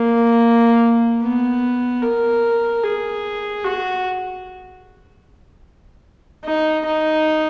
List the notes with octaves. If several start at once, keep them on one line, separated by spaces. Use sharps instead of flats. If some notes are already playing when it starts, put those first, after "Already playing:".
Already playing: A#3
B3
A#4
G#4
F#4
D#4
D#4